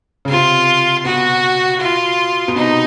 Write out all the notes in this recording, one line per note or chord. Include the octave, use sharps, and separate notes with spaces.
C#3
C3 F4
B2 F#4
F4
B2
C3 D#4